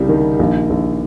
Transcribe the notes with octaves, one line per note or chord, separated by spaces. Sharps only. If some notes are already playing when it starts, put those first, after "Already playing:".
Already playing: C2 C#3 G3
D#3
A#1
A#1